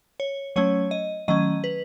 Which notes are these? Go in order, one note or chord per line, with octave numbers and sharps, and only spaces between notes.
C#5
F#3 A3 C#4 C#5
D#5
D#3 F#3 A3 C#4 D#5
B4